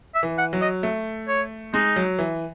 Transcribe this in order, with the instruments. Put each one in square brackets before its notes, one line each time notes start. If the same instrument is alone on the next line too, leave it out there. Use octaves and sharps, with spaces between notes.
[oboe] E5
[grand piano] E3
[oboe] F#5
[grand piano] F#3
[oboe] D#5
[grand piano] A3
[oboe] C#5
[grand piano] G#3 [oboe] D#4
[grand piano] F#3
E3